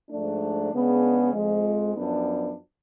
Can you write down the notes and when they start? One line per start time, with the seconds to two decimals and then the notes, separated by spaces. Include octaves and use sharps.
0.10 G#2 F3 A3 D4
0.72 C#3 G#3 B3 D4
1.33 F2 F3 G#3
1.95 F#2 F3 B3 D4